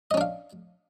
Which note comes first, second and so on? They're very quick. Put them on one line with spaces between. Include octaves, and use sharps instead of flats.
D#5 C#4 D4 F5